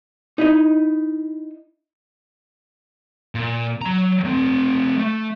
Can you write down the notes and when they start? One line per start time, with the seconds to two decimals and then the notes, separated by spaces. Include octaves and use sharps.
0.38 D#4 E4 D#5
3.35 A#2
3.81 F#3 A#5
4.25 A3 C4
4.98 A3